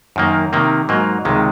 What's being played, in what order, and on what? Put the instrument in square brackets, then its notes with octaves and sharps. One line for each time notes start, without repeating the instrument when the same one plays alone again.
[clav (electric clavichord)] F#2 D#3 A#3
C3 D#3 A#3
G#2 F#3 A#3
C#2 C3 D#3 G#3